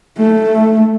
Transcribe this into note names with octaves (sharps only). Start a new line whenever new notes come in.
A3